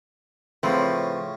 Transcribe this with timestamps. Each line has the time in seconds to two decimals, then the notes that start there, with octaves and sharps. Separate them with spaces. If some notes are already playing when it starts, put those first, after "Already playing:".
0.63 A2 C#3 F3 C4 B4